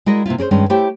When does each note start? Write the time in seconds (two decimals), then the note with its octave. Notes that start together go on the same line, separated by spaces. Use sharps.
0.06 G#3 E4 F#4 A#4 D5 D#5
0.26 C3 A#3 E4 F4
0.38 C#4 G#4 A#4 C5
0.51 G2 D#3 G#3 C#4
0.70 A3 E4 G4 C5 C#5 G5